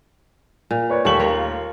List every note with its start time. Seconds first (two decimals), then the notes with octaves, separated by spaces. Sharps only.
0.71 A#2
0.90 B4 C#5 D5
1.05 D#2 G3 A3 E5 C#6 F#7
1.19 F4 A#4 C#5